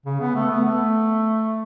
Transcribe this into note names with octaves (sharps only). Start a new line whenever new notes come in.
C#3
B3
A3
B3
A3